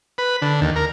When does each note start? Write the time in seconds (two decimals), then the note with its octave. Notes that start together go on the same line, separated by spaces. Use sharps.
0.18 B4
0.42 D3
0.61 D#2
0.76 A#4